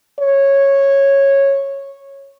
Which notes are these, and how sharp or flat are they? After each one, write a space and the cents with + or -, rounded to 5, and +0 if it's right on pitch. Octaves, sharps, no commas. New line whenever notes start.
C#5 -10